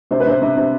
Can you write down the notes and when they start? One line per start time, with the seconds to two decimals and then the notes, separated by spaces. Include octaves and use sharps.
0.11 C3 C5
0.20 B4
0.26 C3 C5
0.42 C3
0.57 C3